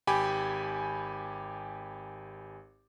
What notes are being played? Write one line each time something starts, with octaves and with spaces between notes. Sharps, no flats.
G#1 G4 G#5 B5 D6